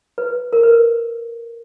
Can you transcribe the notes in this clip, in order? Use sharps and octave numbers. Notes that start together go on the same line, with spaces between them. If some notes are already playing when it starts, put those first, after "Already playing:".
B4
A#4
B4